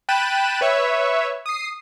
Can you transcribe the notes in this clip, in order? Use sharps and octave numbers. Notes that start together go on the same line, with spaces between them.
G5 B5 F#6 A6 D#7 E7
B4 C#5 E5
D#6 C7